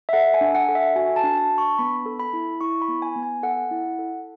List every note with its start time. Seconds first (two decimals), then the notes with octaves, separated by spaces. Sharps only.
0.09 E5
0.13 A4 F#5
0.34 G#5
0.41 D4
0.55 F#5
0.69 A4
0.75 E5
0.96 F#4 G#5
1.16 A5
1.23 D4
1.37 A5
1.51 D4
1.58 C#6
1.79 B3 B5
2.06 A4
2.19 B5
2.33 E4
2.61 E4 C#6
2.82 B5
2.88 B3
3.02 G#5
3.16 B3
3.23 G#5
3.43 A4 F#5
3.71 E4
3.99 A4